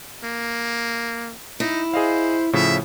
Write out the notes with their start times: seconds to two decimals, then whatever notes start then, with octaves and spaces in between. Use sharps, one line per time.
0.23 A#3
1.60 D#4 E4
1.94 G#4 C5 D#5 F5
2.53 A2 C#3 F3 E5